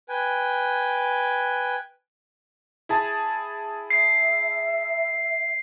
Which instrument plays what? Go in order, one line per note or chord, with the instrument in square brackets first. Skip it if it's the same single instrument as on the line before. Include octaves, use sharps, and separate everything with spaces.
[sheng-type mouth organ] B4 G5 G#5
[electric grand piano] E4 G#4 A5
[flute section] E5 [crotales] C7